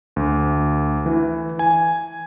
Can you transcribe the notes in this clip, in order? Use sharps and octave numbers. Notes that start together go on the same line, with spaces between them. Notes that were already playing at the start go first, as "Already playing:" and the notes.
D2
E3
G#5